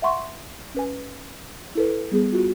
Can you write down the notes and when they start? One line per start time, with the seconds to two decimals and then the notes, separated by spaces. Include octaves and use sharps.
0.02 E5 F#5 C6 C#6
0.74 C#4 B4 G#5
1.75 E4 A4 B4
2.12 G3 B3 G#4
2.32 F4 F#4